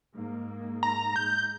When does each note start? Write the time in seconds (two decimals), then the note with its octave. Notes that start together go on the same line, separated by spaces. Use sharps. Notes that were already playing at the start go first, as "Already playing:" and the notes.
0.15 G#2 A#3
0.83 A#5
1.16 G#2 G6